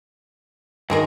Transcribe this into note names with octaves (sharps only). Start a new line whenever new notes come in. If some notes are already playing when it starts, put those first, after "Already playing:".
G2 D#3 F#3 G#3 A#4